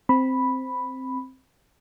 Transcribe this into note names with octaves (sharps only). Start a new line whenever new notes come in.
C4 B5